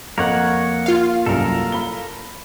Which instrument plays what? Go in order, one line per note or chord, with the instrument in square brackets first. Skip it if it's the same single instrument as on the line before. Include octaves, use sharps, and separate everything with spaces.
[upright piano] F2 [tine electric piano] A#3 [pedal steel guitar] A#4 C#5 F#5
[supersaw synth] F4 F5
[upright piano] C2 F#2 [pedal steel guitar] A4 A#4
[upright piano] B5 G7